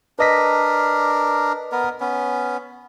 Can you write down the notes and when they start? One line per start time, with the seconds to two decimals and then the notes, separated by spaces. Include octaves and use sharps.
0.19 D4 A#4 B4 D#5 B6
1.72 B3 A#4
2.00 B3 C#4